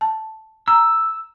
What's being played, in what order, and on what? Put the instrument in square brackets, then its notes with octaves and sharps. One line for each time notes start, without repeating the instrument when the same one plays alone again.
[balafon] A5
[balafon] A#5 [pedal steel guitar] E6